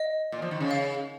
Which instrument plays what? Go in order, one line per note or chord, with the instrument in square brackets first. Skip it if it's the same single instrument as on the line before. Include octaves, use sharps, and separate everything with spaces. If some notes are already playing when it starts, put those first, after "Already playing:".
Already playing: [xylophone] D#5
[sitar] A#2
F3
D#3
C#3
[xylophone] F5